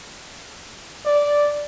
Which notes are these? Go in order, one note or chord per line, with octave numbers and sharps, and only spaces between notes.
D5